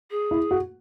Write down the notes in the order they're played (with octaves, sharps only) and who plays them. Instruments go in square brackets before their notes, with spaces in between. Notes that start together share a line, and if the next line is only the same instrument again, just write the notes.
[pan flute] G#4
[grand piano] E4
F#4